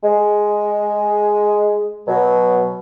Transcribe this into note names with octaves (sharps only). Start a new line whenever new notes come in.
G#3
B2 F#3